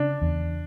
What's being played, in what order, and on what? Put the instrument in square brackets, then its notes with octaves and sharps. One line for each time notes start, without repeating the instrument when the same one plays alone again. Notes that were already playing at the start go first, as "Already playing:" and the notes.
Already playing: [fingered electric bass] C#3 [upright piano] D4
[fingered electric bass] E2